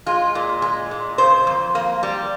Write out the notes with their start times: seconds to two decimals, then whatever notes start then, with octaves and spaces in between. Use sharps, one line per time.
0.06 G#3 F4
0.35 A#2
0.62 G#3
0.91 A#2
1.18 C#3 C5
1.47 F2
1.75 A#3
2.03 G3